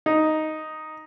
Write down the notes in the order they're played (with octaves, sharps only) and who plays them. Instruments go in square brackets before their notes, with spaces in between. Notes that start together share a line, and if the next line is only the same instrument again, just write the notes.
[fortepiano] D#4